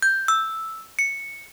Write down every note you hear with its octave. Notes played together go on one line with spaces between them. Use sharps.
G6
E6
C#7